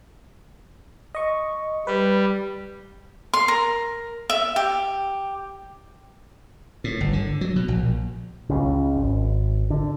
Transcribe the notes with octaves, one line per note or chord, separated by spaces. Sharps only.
D#5 C#6
G3 B4
C6
A#4
E5
G4
A2
G1
D3
F#3
B2
A#1
C#2 C#3
G#1
D3